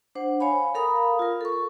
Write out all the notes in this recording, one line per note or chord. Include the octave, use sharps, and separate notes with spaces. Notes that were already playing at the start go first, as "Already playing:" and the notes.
D4 C5 F#5
C#5 F5 G#5 B5
A4 A#4 F5 A#5 B5 D#6
F4 A#4
A4 C#6